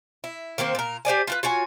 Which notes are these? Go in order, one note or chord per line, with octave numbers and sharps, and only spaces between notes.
E4
D#3 A#3 C4 C5
A#2 A#4
G4 C5 D5 G#5
F4 F#4 B4
F4 F#4 C#5 G#5